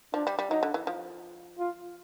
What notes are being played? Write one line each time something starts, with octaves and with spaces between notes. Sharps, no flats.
F3 D4
G3
G3
F#3 D#4
D3
E3
F3
F4